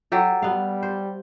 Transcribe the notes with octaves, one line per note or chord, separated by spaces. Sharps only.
F#3 G4 A4
G3 B3 F5
C5